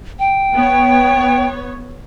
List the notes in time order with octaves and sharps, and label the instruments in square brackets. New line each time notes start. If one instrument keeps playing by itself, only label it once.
[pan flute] G5
[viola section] B3 C#5